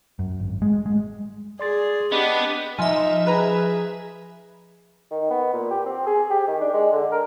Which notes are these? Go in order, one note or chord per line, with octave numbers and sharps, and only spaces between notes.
F#2
G#1
G#3
G#3
G#4 D5 C6 A6
B3 D4 G4 B4 D#5
F3 D#4 E5 G#5
G#4 B4 A#5
D#3
B3
A#2
G4
C4
G#4
G4
D#3
D4
G#3
D3
A#4